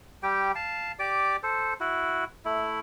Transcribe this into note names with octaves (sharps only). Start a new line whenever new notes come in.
G3 G4 G5
F5 A5
G4 D5 D6
A4 C5
E4 F#4
A3 E4